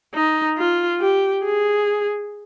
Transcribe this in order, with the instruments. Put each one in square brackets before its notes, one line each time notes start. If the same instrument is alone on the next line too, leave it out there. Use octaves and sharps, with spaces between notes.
[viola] D#4
F4
G4
G#4